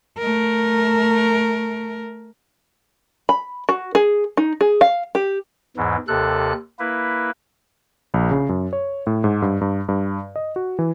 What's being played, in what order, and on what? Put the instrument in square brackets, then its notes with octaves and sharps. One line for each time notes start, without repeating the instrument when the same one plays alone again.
[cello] A3 A#4
[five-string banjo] B5
F#4
G#4
D#4
G#4
F5
G4
[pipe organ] E2 G#2 E3
D#2 C3 A4 F#6
A#3 E4 B4
[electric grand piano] A#1
C#3
F#2
C#5
A2
G#2
G2
G2
G2
D#5
F#4
E3